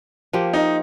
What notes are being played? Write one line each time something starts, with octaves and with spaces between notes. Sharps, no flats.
F3 A#3 G4
D#4